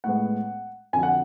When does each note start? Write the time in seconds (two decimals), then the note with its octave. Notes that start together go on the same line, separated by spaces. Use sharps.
0.04 A2 G#3 B3 F#5
0.93 F2 D3 F#3 G#5
1.03 F#5